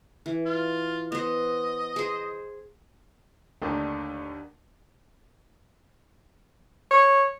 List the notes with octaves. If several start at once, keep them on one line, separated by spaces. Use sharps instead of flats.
E3
F4
B3 C5 D#5
G#4 C5
D#2 D3 D#3 A3 D4 A#4 D5
C#5